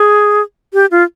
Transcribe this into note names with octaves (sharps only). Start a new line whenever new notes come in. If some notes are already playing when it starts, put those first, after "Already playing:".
Already playing: G#4
G4
F4